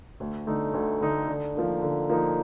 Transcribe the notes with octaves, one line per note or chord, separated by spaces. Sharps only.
D2
D3 A3 D#4
D2
D3 A3 D#4
D3
F3 A#3 D#4
D3
F3 A#3 D#4